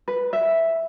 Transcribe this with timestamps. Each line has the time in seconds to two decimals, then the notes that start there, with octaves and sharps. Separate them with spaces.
0.08 B4
0.33 E5